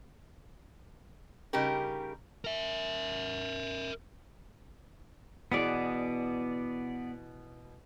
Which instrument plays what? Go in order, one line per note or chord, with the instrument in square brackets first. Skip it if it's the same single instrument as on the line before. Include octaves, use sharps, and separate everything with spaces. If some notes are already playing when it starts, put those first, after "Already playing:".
[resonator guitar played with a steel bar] C#3 G3 D#4 G4 A#4
[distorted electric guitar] A#4 E5
[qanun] B2 E3 G#4 [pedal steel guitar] B3 D5